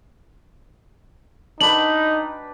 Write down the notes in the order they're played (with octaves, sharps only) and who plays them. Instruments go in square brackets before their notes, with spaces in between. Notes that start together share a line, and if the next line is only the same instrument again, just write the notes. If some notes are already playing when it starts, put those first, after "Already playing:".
[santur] D4 B4 G5 [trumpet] D#4 [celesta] F#7